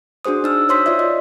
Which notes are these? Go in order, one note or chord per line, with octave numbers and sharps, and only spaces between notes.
D4 F#4 G#4 C5 D#6
D#4 E6 F6
C5 C#5 C6 E6 B6
F4 C#5 D5 E5
D#5